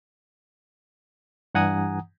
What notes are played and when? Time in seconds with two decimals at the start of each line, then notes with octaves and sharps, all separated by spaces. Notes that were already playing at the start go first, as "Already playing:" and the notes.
1.55 G2 E3 F#5 G#5 A#5 D#6